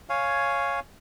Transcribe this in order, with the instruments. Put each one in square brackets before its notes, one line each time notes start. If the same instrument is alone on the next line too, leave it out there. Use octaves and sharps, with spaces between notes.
[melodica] C#5 F5 G#5